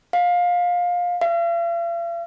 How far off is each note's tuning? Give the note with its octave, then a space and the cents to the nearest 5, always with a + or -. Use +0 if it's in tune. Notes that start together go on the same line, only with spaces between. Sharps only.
F5 +20
F5 -45